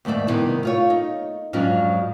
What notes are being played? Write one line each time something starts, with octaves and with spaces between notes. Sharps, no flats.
D#2 G#2 A3 D5 E5
G2 C3 D#3 B3 E4
A3 F4 C#5
D#4
F2 G#2 F#3 C#4 D4 F4